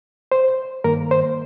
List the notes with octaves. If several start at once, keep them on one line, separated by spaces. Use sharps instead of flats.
C5
G2 D#3 A#3 A#4
C5